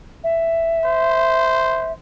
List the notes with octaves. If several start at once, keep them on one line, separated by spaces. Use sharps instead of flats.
E5
C5